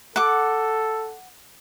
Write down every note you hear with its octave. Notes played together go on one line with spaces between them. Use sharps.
A4 F#5 D6